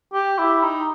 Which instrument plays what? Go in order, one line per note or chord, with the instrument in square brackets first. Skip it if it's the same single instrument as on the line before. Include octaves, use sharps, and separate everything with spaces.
[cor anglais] G4
E4
D#4